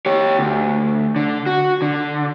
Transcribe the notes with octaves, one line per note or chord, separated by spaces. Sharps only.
G4 C#5
D2
D3
F#4
D3